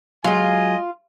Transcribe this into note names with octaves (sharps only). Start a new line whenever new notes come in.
F#3 G#3 F4 D#5 G#5